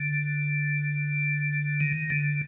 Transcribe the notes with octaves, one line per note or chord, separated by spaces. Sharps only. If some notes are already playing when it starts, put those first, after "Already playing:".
Already playing: D3
D#3
D3